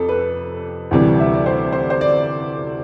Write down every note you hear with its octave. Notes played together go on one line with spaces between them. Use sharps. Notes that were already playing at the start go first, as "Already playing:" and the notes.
Already playing: F2 C3 A4
B4
D2 C3 E3 G3
E5
D5
C5
C5
C5
D5